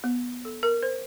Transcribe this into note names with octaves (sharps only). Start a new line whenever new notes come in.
B3
A4
A#4
C5